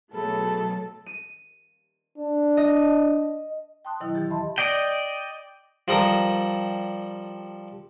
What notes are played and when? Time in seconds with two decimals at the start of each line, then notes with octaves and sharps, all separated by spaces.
0.13 B2 F#3 A3 F#4 G#4 A4 B5
1.06 D#7
2.18 D4
2.57 D#5
3.85 G5 A5 C6 D#6 F#6
4.01 B2 D#3 F#3 E4
4.14 D#2 E3 G4 A6
4.29 D#5 E5 A5 B5 C6
4.58 D5 D#5 G5
5.88 F3 G3 A4 A#4 D#6